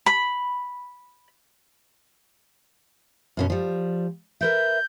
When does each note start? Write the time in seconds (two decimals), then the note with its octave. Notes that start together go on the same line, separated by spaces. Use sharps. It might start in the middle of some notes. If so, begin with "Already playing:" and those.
0.06 B5
3.37 F#2 B2 C#4
3.50 F3 G3
4.41 A#4 B4 E5 G6